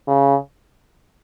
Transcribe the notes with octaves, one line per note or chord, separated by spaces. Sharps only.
C#3